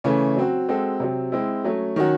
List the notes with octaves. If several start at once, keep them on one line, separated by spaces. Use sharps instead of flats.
C#3 E3 A3 C#4
F#3 C4 F#4
G#3 C4 F#4 A4
C3 F#3 C4
G#3 C4 E4
F#3 A3 C#4
D#3 F#3 C#4 F#4